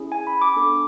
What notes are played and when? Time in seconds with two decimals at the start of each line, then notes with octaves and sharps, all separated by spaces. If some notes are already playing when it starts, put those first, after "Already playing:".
Already playing: C#4 E4 G#4
0.12 G#5
0.27 B5
0.42 D6
0.56 B3 D4 A4